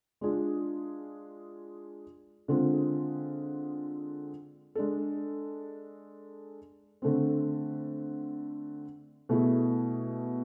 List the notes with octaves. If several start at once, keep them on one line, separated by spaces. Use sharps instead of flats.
G#3 D4 F4 G#4
D3 G#3 C4 F4 G#4
G#3 D4 A4
D3 A3 C4
B2 A3 E4 G#4